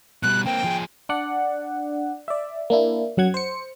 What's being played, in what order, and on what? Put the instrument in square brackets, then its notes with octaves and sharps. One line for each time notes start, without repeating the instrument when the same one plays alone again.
[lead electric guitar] B2 G3 [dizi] F#6
[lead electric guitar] A#3 C4 [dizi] G5
[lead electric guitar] F3 G#4
[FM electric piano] D4 D5 F#5
D5 E5
A#3 D4 E4
F#2 F#3 F#5 G#6
C5 C#7